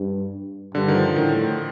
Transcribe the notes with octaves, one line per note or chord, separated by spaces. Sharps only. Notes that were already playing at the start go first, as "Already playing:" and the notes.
Already playing: G2
G2 D3
D#3
F3
A2 D#3